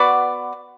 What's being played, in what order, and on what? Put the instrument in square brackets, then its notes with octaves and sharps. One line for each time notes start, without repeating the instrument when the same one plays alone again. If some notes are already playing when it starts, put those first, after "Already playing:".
Already playing: [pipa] B3 F#4 B4 D5